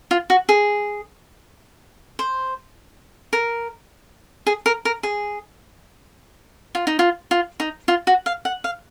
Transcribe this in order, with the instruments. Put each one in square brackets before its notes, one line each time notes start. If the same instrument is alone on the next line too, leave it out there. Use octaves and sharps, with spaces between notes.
[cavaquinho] F4
F#4
G#4
C5
A#4
G#4
A#4
A#4
G#4
F4
D#4
F4
F4
D#4
F4
F#4
F5
F#5
F5